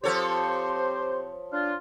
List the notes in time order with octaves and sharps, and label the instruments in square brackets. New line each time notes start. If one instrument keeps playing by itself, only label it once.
[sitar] F3 A4 C#5 [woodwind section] C4 G4 C5
[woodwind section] D4 F4